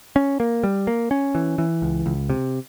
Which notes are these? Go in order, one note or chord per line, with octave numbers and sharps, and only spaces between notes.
C#4
A#3
G3
A#3
C#4
E3
E3
C#2
C#2
C3